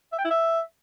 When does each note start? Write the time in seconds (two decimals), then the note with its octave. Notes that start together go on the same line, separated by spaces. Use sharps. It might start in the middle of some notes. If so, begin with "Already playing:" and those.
0.13 E5
0.19 G5
0.25 E4
0.31 E5